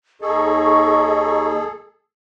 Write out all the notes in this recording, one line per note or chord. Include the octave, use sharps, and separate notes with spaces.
D#2 D#4 G#4 A4 D#5 C#6